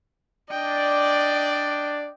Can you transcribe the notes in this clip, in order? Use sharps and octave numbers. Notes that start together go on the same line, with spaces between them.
D4 D5 D#5 G5